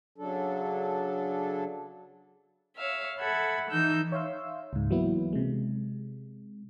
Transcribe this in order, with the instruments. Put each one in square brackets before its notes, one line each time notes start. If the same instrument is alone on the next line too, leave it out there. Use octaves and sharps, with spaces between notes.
[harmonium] C#3 F#3 D4 A4
[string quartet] C#5 E5 F5
A4 E5 F#5 B5 G#6
E3 D#4 E6 G6
[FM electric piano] C#5 E5 F5 C6 E6
C#2 G#2
E3 F#3 A#3 B3 E4
C3 G#3